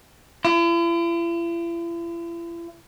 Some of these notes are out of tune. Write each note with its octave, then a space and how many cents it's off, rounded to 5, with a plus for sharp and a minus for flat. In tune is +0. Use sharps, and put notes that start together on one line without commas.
E4 +45